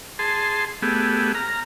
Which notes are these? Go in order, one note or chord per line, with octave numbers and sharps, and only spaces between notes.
G#4 A5 C6
A3 B3 G4 G#4
A#5 F6